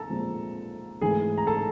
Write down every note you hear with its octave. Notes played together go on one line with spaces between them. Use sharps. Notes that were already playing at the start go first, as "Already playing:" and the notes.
Already playing: A4 A5 A#5
A#2 F3 G#3
G#2 E3 A3 G#4 G#5
A#5
A4 A5